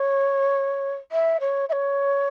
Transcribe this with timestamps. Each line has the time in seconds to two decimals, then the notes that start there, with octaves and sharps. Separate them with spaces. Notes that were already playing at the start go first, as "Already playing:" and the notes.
Already playing: C#5
1.12 E5
1.40 C#5
1.69 E5
1.72 C#5